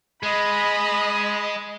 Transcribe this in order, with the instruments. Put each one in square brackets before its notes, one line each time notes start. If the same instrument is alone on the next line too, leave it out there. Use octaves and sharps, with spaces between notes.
[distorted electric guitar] G#3 [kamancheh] D#5 B5